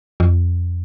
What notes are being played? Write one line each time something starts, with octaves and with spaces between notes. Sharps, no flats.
F2